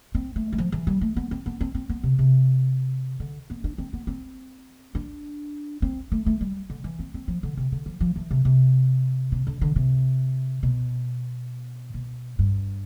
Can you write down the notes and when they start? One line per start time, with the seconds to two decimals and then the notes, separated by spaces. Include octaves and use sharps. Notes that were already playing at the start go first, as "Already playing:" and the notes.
0.15 C4
0.36 A3
0.53 G3
0.58 F3
0.72 E3
0.87 G3
1.01 A3
1.16 B3
1.31 C4
1.46 B3
1.61 C4
1.75 C4
1.89 B3
2.03 C3
2.19 C3
3.20 D3
3.50 B3
3.64 D4
3.78 C4
3.93 B3
4.07 C4
4.95 D4
5.82 C4
6.12 A3
6.26 A3
6.41 G3
6.70 D3
6.84 E3
6.99 C4
7.14 C4
7.28 F3
7.43 D3
7.57 C3
7.72 D3
7.86 F3
8.01 F3
8.16 E3
8.31 C3
8.45 C3
9.32 C3
9.47 D3
9.61 D3
9.76 C3
10.63 B2
11.94 B2
12.39 G2